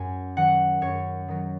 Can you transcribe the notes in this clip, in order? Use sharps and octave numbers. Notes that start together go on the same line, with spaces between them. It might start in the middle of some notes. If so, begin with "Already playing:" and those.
Already playing: F#2 G#5
D#3 F#3 F#5
F#2 C#5
D#3 F#3